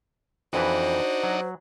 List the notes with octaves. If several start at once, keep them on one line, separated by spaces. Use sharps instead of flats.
F2 E3 D4 D#4 F#4 B4 C5
F#3